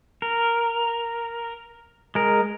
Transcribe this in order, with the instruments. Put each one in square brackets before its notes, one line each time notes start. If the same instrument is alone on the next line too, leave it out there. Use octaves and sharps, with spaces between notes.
[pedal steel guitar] A#4
G#3 A#4